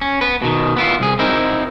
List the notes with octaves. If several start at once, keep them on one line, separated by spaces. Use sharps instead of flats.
C#4
B3 B4
B2 D#3
B3 E4 F4
C2 G#4
C4 D#4 E4 A#4